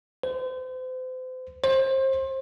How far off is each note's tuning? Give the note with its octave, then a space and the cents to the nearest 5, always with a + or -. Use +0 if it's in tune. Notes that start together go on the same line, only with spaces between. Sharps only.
C5 -35
C5 +30